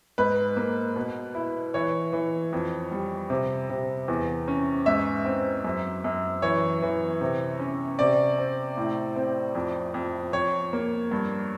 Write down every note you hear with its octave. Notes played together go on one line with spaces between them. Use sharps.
G#2 B4
A#3
B2
E4
E3 C#5
E3
F2
G3
C3
C3
E2
C#4
G#2 E5
C4
F#2
F#2
E3 C#5
E3
C3
C#4
C3 D5
C4
A2
C4
F2
F2
F2 C#5
A#3
G2